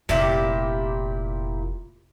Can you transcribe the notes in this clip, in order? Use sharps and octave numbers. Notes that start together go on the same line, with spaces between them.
F1 A#2 E4 G4